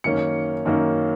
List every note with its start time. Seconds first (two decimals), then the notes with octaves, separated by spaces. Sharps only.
0.04 F#2 D#3 A#3 C#4 C#7
0.65 F#2 D#3 A#3 C#4